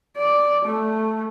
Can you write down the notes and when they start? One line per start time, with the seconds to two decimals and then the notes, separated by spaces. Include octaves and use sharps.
0.17 D5
0.65 A3